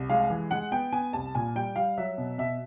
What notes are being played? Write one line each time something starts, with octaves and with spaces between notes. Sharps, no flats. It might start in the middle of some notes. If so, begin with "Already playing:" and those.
Already playing: C2
G#3 F5
E3
G#3 F#5
B3 G5
B3 G#5
C2 A5
A#2 G#5
G3 G5
G3 F5
F#3 E5
B2
B2 E5